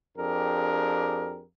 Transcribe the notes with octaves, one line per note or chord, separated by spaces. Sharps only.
F2 D4 G4 G#4 A#4